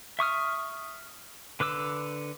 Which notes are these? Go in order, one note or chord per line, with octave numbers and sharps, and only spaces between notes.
E5 C#6 D#6 F6
D3 B4 D6 E6